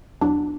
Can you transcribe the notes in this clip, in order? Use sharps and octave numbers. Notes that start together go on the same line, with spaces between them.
E2 B2 F#3 D4